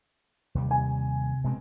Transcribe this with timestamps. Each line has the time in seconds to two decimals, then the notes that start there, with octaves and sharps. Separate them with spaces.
0.55 D#2 C3 G3
0.71 G#5
1.44 B2 G#3 C4